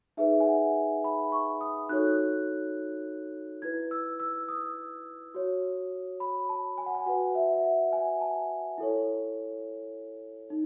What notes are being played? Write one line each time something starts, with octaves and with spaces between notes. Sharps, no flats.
D#4 G#4 B4 E5
G#5
F#5
B5
C#6
D#6
D#4 F#4 A4 C#5 F#6
E4 B4 G#6
E6
E6
D#6
F#4 C#5
B5
A5
G#5
F#5
G#5
F#4 B4 F#5
E5
E5
F#5
G#5
A5
E4 A4 C#5
D#4